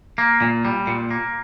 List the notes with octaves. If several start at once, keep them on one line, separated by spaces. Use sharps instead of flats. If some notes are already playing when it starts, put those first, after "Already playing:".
A#3
A#2
G3
A#2
A#3